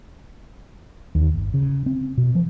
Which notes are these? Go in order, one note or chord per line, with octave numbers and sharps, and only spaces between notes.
D#2
G1
C#3
C4
B2
F3